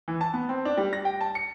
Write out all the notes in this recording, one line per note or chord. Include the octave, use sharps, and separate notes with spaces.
E3
A5
B3
C4
D4
G3
A#6
G5
A5
C#7